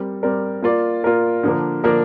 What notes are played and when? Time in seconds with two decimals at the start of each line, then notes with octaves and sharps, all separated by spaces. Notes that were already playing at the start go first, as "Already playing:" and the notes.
Already playing: G3 C4 A#4 D5
0.23 G3 C4 A#4 D5
0.62 A#3 F4 A#4 D5
1.04 A#3 F4 A#4 D5
1.43 D3 F3 A#3 D4 A#4
1.83 D3 F3 A#3 D4 A#4